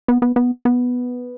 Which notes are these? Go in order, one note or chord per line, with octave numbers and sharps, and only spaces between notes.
B3
B3
B3
B3